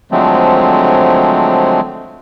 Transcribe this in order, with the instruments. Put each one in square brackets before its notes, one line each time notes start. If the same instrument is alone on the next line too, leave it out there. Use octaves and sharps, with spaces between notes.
[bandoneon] D3 F3 F#3 G#3 A3 C4